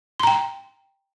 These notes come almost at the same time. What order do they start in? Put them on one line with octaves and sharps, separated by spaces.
C6 A#5 G5